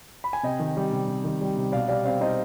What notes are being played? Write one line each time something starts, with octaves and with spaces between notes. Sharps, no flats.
B5
G#5
C3 D#5 G5
D#3
G3
C3
C3
D#3
G3
C3
B2 D5 F5
G3 D5 F5
C4 D5 F5
D#4 C5 D#5